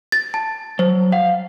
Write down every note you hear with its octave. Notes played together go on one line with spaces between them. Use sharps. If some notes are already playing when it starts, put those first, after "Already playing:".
A6
A5
F#3 C5
F5 F#5